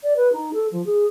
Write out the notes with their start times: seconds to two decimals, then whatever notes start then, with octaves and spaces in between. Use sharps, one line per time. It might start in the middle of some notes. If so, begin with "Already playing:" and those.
0.03 D5
0.17 B4
0.32 D#4
0.53 A4
0.72 F3
0.86 G#4